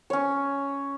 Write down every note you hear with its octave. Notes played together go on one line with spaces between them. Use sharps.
C#4 C#5